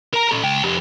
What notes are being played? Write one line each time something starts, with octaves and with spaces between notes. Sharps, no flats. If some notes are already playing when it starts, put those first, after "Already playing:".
A#4 A#5
C#4 A4
C#2 G5
F2 G4